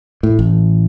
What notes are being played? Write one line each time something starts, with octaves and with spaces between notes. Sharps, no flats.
A2
A1